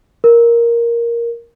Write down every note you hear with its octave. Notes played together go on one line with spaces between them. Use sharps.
A#4